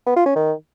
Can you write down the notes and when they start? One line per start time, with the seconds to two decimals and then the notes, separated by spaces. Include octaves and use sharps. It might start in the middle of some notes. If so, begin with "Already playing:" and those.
0.06 B3
0.16 F4
0.26 C#4
0.36 D#3